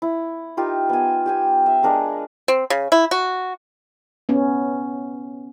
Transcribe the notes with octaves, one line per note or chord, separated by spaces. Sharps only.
E4
D#4 F4 G4 A#4
B3 G#5
G4 G5 G#5
E5
G#3 D4 A#4 F5
C4
C#3
E4
F#4
B3 C#4